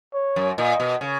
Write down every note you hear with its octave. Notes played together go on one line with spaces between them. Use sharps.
C#5
F#2
A#2 D#5
B2
C#3